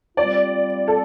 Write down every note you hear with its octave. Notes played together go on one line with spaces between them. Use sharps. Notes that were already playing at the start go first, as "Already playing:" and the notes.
G3 C4 F4 D5
A4